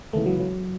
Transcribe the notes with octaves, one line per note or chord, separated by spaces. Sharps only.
C#2 C#3 E3 A3 B3 E4
F#3
F#3